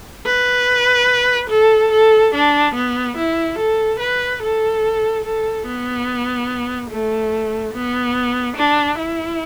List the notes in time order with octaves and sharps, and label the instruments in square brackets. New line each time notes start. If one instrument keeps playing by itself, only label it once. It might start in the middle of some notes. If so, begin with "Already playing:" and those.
[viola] B4
A4
A4
D4
B3
E4
A4
B4
A4
A4
B3
A3
B3
D4
E4